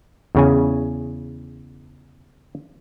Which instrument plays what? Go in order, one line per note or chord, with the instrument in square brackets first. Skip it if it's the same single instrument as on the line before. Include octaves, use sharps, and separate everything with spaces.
[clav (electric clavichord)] E2 C#3 G#5